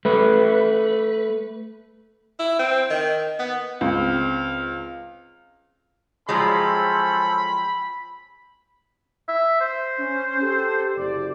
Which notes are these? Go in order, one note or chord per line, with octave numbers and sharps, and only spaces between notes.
A3 B4
E4
C4
D#3
B3
C#2 C4 F5
F3 F#3 G#3 C4 C#4 A4 B5
E5
C5
C#4
G4 A4
F#1 C3 D5